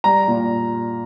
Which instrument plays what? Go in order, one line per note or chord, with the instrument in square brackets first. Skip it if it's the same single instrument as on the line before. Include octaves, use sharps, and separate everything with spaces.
[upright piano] G3 A#5
A#2